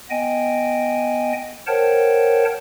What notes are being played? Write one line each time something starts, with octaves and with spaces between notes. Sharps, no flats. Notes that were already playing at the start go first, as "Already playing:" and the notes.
B3 D#5 G5 G#5
A#4 C5 C#5 F#5 G5 A5